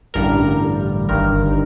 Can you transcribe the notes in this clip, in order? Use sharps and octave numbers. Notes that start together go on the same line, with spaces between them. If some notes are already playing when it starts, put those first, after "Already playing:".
A1 G2 D3 G3 A#4
G1 G2 D#3 A#4